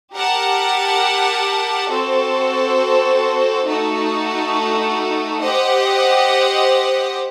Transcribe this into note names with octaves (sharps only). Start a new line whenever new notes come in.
G4 A#4 F#5 A5
C4 F#4 A4 C5
A3 D#4 F#4 A4
G4 C5 D#5 F#5